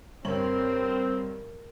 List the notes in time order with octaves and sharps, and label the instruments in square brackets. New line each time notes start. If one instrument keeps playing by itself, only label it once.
[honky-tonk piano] G2 C#5 F#7 [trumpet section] C4 [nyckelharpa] A#4